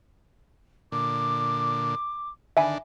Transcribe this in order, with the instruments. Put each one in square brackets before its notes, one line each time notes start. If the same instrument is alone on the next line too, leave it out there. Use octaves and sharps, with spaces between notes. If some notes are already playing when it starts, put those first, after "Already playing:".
[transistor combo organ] A#2 D3 [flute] D6
[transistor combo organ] D3 D#3 D4 [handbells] E5 G#5 B5